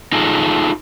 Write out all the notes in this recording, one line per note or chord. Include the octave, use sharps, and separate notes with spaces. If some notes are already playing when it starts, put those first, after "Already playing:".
D#4 F4 G#4 A4